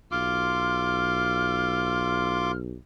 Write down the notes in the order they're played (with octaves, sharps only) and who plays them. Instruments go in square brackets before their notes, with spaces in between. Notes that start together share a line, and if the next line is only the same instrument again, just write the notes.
[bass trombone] B1 [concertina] F4 C6 D6 [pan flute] F6